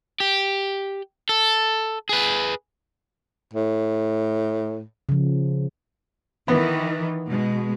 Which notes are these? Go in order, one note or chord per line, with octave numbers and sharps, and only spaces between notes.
G4
A4
G#4 B4
A2
C#3 F3
D#3 E3 B3
B2 G#3